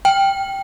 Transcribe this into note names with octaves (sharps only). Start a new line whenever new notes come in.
G5